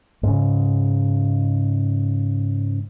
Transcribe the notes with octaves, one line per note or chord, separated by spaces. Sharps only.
G#2 C#3